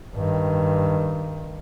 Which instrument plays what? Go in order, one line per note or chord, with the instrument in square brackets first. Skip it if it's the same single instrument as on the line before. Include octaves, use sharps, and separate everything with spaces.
[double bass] G2 D#3